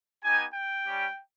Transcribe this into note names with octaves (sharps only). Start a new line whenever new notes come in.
B3 D#4 G4 G#5
G5
G3 C#4 G4